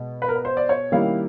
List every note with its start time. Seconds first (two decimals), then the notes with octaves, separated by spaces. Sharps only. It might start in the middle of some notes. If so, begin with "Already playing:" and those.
Already playing: B2 G#3
0.22 B4
0.28 A#4
0.35 B4
0.45 C5
0.57 D5
0.69 C#5
0.92 D#3 G3 A#3 C#4 E4 F5